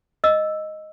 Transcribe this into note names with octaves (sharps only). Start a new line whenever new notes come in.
D#5 E6